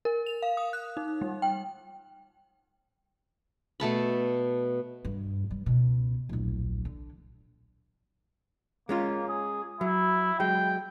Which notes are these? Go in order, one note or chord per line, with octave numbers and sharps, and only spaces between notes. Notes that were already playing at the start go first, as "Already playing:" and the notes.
A#4
F7
F5
D#6
F#6
D#4
G3
G5
B2 A3 A5 B5
G2
G3
C#2 B2
D1 A#1
D3
G#3 A#3 C#4 F4
G#4
F#3 E4
F#3 G#3 G5